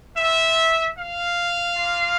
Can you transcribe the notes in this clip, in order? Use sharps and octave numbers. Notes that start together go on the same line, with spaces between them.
C4 F4 E5
F5
A#3 F4